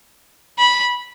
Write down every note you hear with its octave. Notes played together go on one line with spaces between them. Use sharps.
B5